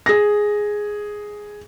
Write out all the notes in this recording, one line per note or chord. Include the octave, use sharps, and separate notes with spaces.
G#4 A#6